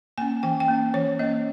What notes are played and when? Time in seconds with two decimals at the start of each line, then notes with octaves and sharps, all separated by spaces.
0.18 A#3 C#4 G#5
0.43 E3 G5
0.60 G5
0.68 A#3 C#4
0.94 E3 C#5
1.19 A#3 C#4 D#5